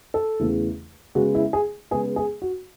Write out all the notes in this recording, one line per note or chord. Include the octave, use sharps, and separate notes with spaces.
A4
E2 C#3 E3 A3
C#3 G#3 B3 F#4
E4
G#4
C#3 G#3 B3 G#4
G#4
F#4